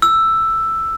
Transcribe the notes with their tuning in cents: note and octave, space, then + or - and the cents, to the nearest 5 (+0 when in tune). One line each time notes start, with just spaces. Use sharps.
E6 +5